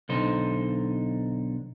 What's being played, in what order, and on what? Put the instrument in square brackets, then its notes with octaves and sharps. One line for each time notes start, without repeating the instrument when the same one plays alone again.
[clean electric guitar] B1 D3 D#4 C5